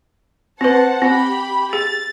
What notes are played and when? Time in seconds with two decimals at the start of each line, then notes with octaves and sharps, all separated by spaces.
0.61 C4 B4 C5 F#5 A5
1.02 C4 G4 B5
1.73 G#4 A6